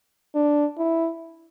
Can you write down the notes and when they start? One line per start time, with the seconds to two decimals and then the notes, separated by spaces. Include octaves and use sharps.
0.35 D4
0.78 E4